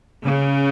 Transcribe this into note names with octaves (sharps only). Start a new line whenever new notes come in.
C#3